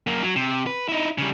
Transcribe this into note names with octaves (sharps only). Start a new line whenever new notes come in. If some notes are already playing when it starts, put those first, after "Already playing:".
F#2 A#3
F#3
C3
B4
D#4 E4
C#3 G3